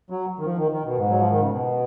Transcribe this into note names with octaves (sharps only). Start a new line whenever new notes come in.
F#3
D#3
F3
D#3
D#3
B2
G#2
F#3
F3
D#3
C#3
B2